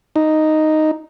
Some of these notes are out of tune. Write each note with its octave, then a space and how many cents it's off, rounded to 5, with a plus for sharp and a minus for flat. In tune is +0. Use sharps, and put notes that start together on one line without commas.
D#4 +0